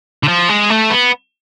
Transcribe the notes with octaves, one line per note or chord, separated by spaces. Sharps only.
D3
F3
G#3
A3
B3